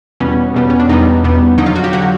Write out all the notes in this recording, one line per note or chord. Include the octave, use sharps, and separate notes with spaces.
E2 B2 G3 B3 C#4
E2 B2 G3 B3
C#4
D4
E2 B2 G3 B3 D#4
E2 B2 G3 B3
F2 D3 F#3 D#4
F4
F#4
G4
D3 F#3 F#4